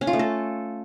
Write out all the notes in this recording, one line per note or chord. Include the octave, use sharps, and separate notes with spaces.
C#4
F4
A3
A4